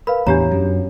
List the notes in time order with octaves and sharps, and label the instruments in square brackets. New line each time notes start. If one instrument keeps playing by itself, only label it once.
[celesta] A#4 B4 F5 [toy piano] B5
[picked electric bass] E2 A2 [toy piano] D4 G4 A#5 [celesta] C#5
[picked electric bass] F#2